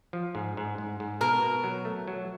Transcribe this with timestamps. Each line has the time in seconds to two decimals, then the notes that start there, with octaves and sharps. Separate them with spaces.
0.13 F3
0.35 G#2
0.57 G#2
0.78 G#2
1.00 G#2
1.21 B2 A#4
1.42 B2
1.64 F#3
1.85 A3
2.08 F#3